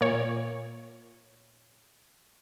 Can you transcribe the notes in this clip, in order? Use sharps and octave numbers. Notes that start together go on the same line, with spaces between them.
A#2 C#5